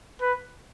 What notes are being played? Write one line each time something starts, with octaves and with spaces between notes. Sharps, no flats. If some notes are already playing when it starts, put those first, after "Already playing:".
B4